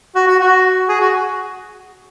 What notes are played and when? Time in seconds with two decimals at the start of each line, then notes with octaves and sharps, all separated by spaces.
0.16 F#4
0.27 F#4
0.40 F#4
0.89 G#4
1.00 F#4